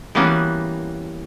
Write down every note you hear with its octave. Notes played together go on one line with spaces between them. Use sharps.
E3 G3 A#3 B3 C#4 F#4